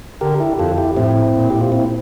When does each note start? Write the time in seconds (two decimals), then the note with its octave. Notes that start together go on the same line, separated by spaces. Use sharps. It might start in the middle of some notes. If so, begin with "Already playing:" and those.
0.21 D3 G4 A#4
0.40 E4 G4
0.58 F2 F4 A4
0.78 E4 G4
0.96 A2 C4 E4
1.34 A#2
1.50 G4
1.61 F4
1.72 C4 E4